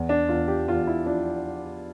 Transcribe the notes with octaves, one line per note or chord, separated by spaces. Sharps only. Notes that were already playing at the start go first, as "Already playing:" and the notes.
Already playing: E2
D4
E2 F4
G4
E2 F4
E4
F3 D4